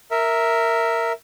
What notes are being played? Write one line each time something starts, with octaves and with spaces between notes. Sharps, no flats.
A#4 E5